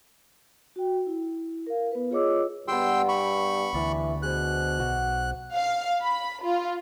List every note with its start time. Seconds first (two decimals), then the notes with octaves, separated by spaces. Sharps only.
0.76 F#4 G5
1.06 E4
1.67 A#4 F5
1.92 B3 B4
2.11 F4 G#4 C#5 D#5 D6 E6
2.68 G2 B3 G4 G5 C6 E6
3.09 B5 C#6
3.74 D2 E3 B4 D5
4.22 B2 G#4 C5 F#6
4.79 B1 F#4
5.53 F5
6.02 B5
6.43 F4